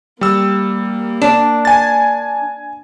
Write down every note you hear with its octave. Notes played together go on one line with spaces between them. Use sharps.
G3 A#3 E6
D4
G#5 A6